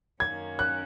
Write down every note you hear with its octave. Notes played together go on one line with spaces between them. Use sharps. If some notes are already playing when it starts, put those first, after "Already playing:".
F#2 D#3 A#3 C#4 G#6
F#6